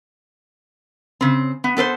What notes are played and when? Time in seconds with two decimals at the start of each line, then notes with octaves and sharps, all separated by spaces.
1.21 C#3 C4
1.64 B3
1.77 B3 A4 B4 C5